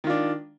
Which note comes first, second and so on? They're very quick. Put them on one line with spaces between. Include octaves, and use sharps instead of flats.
D#3 F4 D4